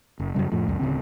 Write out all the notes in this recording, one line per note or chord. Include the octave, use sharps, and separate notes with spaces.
F#1
F#2 A2 C#3 G3
F2 A2 F3
C#2 F#2
D1 C2 C#3 C4